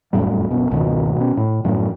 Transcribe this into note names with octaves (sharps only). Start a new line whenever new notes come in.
F#1 F2 A2 G3
F#1 B2
G#1 C#2 B2 D#3
B2 C#4
A2
F#2 A2 F3